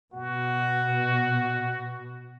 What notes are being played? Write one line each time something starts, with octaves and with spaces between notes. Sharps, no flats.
B2 F#4